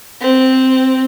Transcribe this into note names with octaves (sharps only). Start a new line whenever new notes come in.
C4